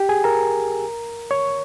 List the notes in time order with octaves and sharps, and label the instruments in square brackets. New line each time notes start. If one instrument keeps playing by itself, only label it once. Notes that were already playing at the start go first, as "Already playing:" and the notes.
Already playing: [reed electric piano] G4 G5
G#4 G#5
A#4 A#5
C#5 C#6